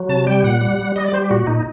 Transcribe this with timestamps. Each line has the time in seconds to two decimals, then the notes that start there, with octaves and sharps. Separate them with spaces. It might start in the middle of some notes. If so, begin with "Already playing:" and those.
Already playing: F#3
0.09 C3 A5
0.27 G3 G5
0.44 A#2 F#5
0.61 G3
0.79 G3
0.96 G3 D#5
1.04 D5
1.13 G3 C5
1.22 G4
1.30 A#2 F#4
1.47 A#2 D#4